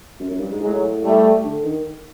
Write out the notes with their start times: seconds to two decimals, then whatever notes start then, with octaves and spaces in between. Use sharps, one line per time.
0.20 F#2
0.30 F#2
0.40 G2
0.51 G#2
0.61 A2 F#3 G#3
1.03 G3 A3
1.44 D3
1.64 D#3